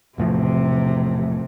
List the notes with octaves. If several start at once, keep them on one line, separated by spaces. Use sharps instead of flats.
E1 A2 C3 F3